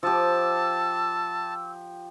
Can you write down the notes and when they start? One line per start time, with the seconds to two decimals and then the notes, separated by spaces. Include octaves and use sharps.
0.03 F3 G4 A5 E6